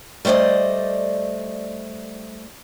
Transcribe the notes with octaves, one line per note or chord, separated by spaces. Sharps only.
G3 A3 C5 D5 D#5